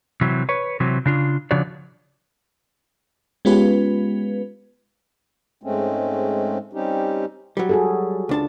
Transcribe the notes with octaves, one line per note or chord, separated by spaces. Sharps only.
C3 E3 F#3
B4 C#5
C3 E3 F#3
C#3 D4 F4
C#3 F3 D4 F#4 C#5 D5
G#3 B3 C#4 F4 G4 B4
G#2 G#3 A3 C4 C#4
G3 C4 C#4 D#4 G4
F#3 G3
F#4 G#4 A4
C#2 D4 A5